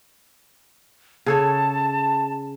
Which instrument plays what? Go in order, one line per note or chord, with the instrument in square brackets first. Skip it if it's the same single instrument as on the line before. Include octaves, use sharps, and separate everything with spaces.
[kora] C#3 A4 C#5 [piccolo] A5